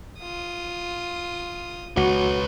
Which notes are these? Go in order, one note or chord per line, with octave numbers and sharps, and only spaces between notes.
F4 D#6
C#2 F#4 B4 C#5